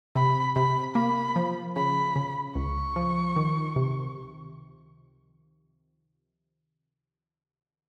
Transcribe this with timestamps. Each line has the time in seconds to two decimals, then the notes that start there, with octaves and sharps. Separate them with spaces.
0.15 C3 B5
0.56 C3 B5
0.95 A#3 B5
1.36 F3
1.76 C#3 B5
2.16 C#3
2.55 C#2 C#6
2.96 F3
3.36 D#3
3.76 C3